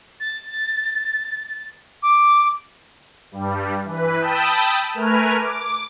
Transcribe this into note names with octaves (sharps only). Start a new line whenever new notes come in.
A6
D6
G2 G3
E3 B4
G5 A5 B5 D#6 E6 G6
A3 A#4 B4 G#5 F6
D6